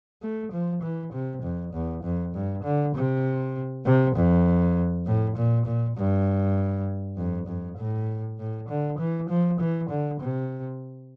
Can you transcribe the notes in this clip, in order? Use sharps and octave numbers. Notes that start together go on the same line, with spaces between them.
A3
F3
E3
C3
F2
E2
F2
G2
D3
C3
C3
F2
A2
A#2
A#2
G2
F2
F2
A2
A2
D3
E3
F3
E3
D3
C3